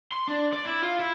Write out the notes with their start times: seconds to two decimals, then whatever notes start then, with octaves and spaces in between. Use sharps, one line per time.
0.12 C6
0.28 D4
0.53 D5
0.65 E4
0.82 F4
0.99 E4